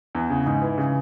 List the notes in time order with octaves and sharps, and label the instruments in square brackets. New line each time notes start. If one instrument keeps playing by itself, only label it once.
[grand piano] E2
C#3
G#2
E3
C#3